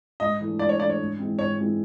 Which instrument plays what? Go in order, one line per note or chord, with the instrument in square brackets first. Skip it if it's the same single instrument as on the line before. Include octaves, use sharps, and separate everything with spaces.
[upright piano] G#2 [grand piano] D#5
[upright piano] E3 A3 D4
[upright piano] G#2 [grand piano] D5
[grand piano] C#5
[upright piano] E3 A3 D4 [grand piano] D5
[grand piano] C#5
[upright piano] G#2
E3 G#3 C4
[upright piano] G#2 [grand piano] C#5
[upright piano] E3 G#3 C4